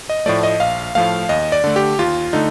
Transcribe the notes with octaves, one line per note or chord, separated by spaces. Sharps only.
D#5
A2 F3 A3 D5
D#5
A#1 F5
A2 F3 A3 F5
D#2 D#5
D5
D3 A3
G4
D#2 F4
D3 A3 D#4